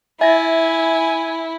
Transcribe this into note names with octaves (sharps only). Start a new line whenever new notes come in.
E4 E5 G#5 A#6